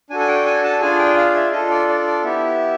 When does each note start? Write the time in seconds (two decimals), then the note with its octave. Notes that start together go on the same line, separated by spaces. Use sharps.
0.10 D4 F#4 A4 G#5
0.20 G#5
0.28 G5
0.46 G#5
0.64 A5
0.81 D4 F4 G#4 G#5
0.99 G5
1.17 F5
1.35 E5
1.52 D4 F4 A4 D#5
1.71 D5
1.88 D5
2.07 D5
2.24 B3 E4 G4 E5